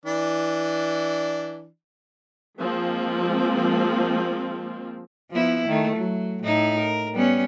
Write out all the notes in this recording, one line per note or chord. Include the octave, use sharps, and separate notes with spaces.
E3 D4
F3 G#3 A#3 C4
F3 B3 E4
D#3 A3
F#3
A2 D#4 E4
A#4
G3 B3 C#4